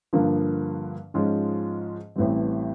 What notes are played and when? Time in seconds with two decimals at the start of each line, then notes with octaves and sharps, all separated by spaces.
0.13 G2 D3 F3 A#3
1.14 G#2 F3 G#3 C#4 F4
2.16 A1 A2 E3 G3 C4